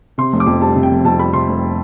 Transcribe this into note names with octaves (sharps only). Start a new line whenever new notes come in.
C3 C6
F1
D6
F2
G3 A5
C3
G5
F1
F2 A5
G3 B5
C3 C6
F1